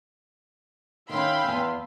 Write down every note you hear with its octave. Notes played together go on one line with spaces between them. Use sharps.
D#3 C#4 E5 F5 G5 B5 C6
E2 G#5